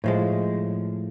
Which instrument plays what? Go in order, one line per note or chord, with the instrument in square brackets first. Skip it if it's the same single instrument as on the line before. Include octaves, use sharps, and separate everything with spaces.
[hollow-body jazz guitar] A2 F3 G#3